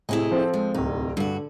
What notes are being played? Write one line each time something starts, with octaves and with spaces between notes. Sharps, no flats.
A2 C3 E4 G#4 D#5
F3 C4 A4
G#3
D1 C2 D#4
G2 D3 F#4